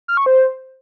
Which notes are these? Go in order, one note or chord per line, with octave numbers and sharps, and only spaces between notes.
F6
C#6
C5